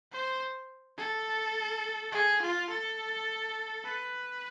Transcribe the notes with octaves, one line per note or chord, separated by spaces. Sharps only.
C5
A4
G#4
F4
A4
B4